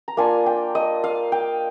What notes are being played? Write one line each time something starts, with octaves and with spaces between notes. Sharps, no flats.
A#5
A#3 D4 F4 G#5
G5
D#5
F5
G5